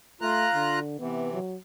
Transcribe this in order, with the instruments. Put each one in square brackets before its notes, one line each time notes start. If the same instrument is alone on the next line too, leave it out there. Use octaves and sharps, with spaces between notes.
[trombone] A3 [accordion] F4 A#5 F#6
[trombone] D3
[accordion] C3 E3 [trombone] B3
[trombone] F#3